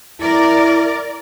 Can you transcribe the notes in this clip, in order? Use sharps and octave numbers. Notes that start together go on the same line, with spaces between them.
E4 A#4 D5